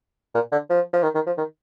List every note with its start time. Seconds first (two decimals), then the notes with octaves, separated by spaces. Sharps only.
0.35 A#2
0.52 D3
0.70 F3
0.93 F3
1.03 D#3
1.15 D#3
1.27 F3
1.38 D#3